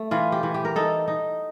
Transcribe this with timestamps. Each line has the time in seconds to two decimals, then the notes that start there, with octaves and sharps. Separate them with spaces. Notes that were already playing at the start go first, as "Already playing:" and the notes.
Already playing: A3
0.11 E3 F4
0.32 G4
0.43 E3
0.54 G4
0.65 A#4
0.76 D#4 A4
1.08 D#4